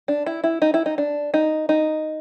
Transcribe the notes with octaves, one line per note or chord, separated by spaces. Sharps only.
D4
E4
E4
D#4
E4
D#4
D4
D#4
D#4